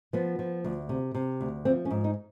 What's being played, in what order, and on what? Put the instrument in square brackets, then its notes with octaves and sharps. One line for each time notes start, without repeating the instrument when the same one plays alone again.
[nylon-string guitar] F3 B3
F3
D2
C3
C3
D2
F3 C4
C#4
G#2
D#4